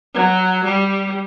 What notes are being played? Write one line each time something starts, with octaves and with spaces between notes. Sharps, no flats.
F#3
G3